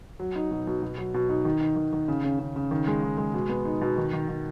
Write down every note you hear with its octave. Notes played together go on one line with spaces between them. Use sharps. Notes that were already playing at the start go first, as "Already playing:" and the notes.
F#3
D#4
B2
B2
B2
F#3
B2
D#4
D#3
D#4
D#3
D#3
C#3
C#3
C#3
C#3
D#3
G#3
D#3
G#3
B2
B3
D#4
B2
D#3
D#3
D#3